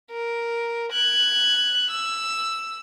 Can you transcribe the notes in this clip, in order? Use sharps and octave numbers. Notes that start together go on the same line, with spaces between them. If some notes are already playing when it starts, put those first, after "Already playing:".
A#4
F#6 G#6
E6